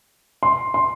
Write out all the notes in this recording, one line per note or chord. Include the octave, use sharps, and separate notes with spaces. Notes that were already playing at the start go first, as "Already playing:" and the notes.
C6
C6